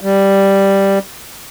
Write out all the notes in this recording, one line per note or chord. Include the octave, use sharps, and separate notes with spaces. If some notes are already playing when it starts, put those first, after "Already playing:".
G3